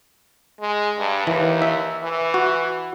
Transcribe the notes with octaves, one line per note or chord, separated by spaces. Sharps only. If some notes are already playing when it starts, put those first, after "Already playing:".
G#3
G2
D#2 E3
E5
E3
F#4